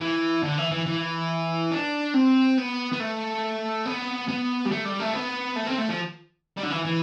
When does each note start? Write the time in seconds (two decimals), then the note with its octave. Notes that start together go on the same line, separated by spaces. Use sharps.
0.01 E3
0.43 D3
0.58 E3
0.71 E3
0.86 E3
1.71 D4
2.14 C4
2.58 B3
2.92 B3
3.00 A3
3.85 B3
4.28 B3
4.66 G3
4.72 A3
4.86 G3
5.00 A3
5.14 B3
5.56 A3
5.67 C4
5.78 A3
5.89 F3
6.57 G3
6.63 D3
6.70 E3
6.85 E3